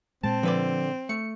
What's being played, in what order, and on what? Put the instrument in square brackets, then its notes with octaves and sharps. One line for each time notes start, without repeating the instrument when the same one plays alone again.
[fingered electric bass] A#2 G#3 [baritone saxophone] C4 [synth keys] A5
[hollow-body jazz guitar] D3 B4 D5 [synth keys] F3
[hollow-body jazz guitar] A3 [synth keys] C#7